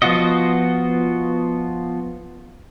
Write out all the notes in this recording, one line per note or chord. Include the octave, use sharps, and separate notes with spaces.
F3 B3 F4 F#4 D#5